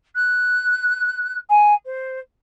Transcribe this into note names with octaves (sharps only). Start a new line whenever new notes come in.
F#6
G#5
C5